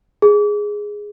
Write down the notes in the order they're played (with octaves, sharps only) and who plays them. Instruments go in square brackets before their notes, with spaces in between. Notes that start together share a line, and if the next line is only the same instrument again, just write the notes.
[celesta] G#4